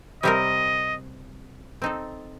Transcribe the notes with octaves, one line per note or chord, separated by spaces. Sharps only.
C3 G3 C4 G4 A#4 D#5
C4 D#4 A4